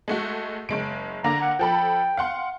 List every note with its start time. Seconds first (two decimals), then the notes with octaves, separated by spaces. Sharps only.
0.08 G#3 A3 F#4
0.69 F#1 G#3 D7
1.24 D3 A#3 A#5
1.42 F#5
1.59 F3 A4 G5 B5
2.17 F5 F#5 C6